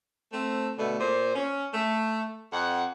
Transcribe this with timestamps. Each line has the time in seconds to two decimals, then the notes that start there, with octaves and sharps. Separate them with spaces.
0.32 A3 C4
0.78 B2 D3 A3
1.00 A#2 C5
1.35 C#4
1.74 A3
2.53 F2 F#5